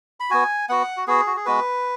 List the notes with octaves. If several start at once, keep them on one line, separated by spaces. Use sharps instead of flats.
B5
B3 F#4 G#5
B3 F#4 F#5
F#4
B3 F#4 G#4
F#4
G#4
G#3 B3 F#4 B4